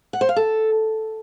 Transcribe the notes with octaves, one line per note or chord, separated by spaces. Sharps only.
F#5
C5
F5
A4